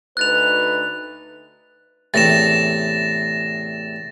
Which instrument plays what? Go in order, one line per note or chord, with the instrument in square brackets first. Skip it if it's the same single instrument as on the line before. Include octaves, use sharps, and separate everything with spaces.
[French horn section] D2 D#4 B4 [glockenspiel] F#6 A6 F7
[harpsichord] E2 A2 C3 [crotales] A6 A#6 E7